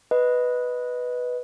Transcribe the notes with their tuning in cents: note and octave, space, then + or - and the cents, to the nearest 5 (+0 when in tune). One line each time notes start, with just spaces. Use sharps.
B4 +0 D#5 +5